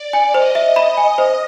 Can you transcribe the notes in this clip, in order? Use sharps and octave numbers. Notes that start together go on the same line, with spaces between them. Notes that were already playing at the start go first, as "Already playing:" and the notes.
Already playing: D5
G#5
C5 D#5
E5
B5
D#5 G#5
C5